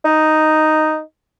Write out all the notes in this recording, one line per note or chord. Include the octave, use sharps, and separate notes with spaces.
D#4